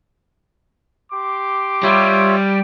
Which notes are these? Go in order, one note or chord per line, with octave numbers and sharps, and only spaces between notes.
G4 C6 D6
G3 F4 C#5 E5